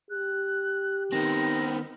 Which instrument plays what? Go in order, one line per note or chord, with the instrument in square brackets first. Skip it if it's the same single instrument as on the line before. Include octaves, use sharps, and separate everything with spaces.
[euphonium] G4 [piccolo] F#6
[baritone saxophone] D#3 [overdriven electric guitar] B3 C4 [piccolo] A#6